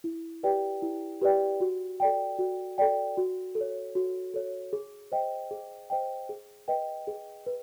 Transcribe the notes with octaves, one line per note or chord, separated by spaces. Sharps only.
E4
G4 B4 D5 G5
E4
G4 B4 D5 G5
F#4
A4 D5 G5
F#4
A4 D5 G5
F#4
A4
C#5
F#4
A4 C#5
G#4
C5 D#5 G5
G#4
C5 D#5 G5
G#4
B4 D#5 G5
G#4
B4